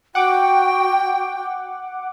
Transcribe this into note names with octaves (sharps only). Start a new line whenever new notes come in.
F#4 F#5 G5 D6